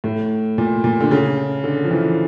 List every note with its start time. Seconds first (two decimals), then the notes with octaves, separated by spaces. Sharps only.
0.04 A2
0.58 A#2
0.84 A#2
1.00 D3
1.11 C#3
1.64 D3
1.84 F3
1.91 E3